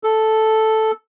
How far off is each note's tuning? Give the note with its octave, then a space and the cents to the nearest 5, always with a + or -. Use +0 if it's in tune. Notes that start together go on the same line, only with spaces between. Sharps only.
A4 -5